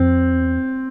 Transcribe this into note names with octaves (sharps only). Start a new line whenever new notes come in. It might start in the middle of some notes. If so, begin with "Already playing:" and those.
Already playing: F2 C4
E2